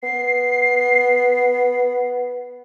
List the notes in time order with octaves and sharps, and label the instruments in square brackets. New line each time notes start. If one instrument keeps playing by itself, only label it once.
[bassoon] B3 [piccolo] C7